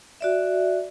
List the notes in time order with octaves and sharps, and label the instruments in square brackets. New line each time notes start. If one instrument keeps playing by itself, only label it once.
[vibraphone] F#4 D5 E5